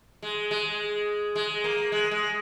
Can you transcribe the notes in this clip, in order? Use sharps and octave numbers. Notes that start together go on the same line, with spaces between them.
G#3
G#3
G#3
A#3
G#3
G#3